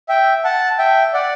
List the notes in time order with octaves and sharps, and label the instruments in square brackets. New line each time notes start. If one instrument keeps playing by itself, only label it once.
[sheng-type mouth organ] E5 G5
F#5 A5
E5 G5
D5 F#5